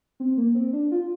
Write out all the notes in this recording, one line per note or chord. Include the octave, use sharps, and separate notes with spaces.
C4
A#3
C4
D4
F4